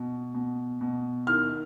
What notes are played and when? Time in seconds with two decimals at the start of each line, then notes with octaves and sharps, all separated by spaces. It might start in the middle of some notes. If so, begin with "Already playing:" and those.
Already playing: B2
0.34 B2
0.81 B2
1.27 D#3 F6